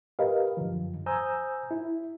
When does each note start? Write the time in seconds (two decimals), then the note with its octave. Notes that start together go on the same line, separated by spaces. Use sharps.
0.19 G4 A#4 B4 D#5 F5
0.57 F#2 D3 F3
1.06 C5 G#5 A#5 D#6 E6 G6
1.71 E4